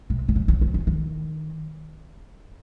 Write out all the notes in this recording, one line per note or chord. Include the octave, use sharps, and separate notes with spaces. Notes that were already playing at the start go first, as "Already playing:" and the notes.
C3
D3
C#3
D3
C#3
D3
D#3